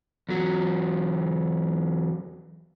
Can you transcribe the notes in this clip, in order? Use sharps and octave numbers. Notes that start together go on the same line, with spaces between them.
E2 F#3